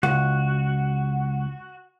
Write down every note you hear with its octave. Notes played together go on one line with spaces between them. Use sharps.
C#2 F#4